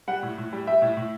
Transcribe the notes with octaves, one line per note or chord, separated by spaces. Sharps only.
G3 F#5
A2
A2
G3
G3 E5
A2
A2